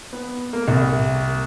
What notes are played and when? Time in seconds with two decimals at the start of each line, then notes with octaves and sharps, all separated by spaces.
0.13 B3
0.53 A#3
0.68 C2